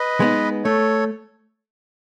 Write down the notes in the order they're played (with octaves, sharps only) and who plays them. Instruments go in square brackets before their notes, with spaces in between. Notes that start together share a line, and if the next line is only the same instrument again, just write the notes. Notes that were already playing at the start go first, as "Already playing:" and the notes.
Already playing: [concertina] B4 D#5
[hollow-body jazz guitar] G#3 B3 D#4
[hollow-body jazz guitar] A3 [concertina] A4 C#5